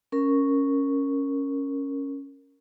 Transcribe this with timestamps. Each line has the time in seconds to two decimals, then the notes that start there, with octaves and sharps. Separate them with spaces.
0.12 C#4 A#4